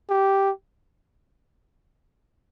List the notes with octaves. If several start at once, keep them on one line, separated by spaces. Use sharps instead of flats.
G4